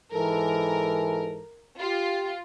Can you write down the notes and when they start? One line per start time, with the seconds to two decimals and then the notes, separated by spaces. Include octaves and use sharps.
0.12 G#2 E3 A4 A#4
1.80 F4 G4